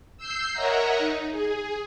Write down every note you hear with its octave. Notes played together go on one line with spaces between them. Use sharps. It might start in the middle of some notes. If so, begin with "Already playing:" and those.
E6 G6 C7
A#4 C#5 D#5 E5 F#5 A#5
D#4
G#4